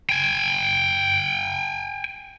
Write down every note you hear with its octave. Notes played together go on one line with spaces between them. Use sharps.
G5 G#5